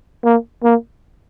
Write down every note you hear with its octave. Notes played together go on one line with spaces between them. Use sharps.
A#3
A#3